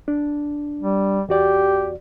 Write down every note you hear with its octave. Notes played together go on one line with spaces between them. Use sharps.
D4
G3
E2 F#4 G4 D5